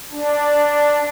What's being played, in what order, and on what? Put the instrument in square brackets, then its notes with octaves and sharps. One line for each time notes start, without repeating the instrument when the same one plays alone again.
[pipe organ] D4